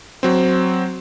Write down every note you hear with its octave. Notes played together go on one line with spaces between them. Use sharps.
F#3 C4